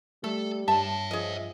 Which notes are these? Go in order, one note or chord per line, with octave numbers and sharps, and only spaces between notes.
G3 A3 A4 E5
G2 C#5 E5 A5
F3 G#4 D#5